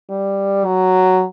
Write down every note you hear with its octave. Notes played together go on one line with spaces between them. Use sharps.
G3
F#3